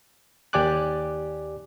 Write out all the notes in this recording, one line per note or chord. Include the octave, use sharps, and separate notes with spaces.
D#2 G4 D5 G#5 D6 F#6